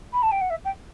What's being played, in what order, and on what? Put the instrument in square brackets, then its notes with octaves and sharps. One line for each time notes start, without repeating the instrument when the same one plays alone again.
[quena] B5
A5
G5
F#5
E5
G5